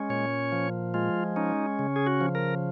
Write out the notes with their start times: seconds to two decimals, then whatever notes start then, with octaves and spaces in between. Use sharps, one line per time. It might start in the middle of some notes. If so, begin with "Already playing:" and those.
Already playing: G#3 C#4
0.09 A#2 C#5
0.52 F3
0.94 G#3 F4
1.36 C#4 D#4
1.79 C#3
1.96 G#4
2.06 F#4
2.21 F3
2.35 A#4